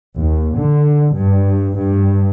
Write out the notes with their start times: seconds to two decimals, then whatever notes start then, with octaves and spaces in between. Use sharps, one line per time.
0.21 D#2
0.56 D3
1.14 G2
1.77 G2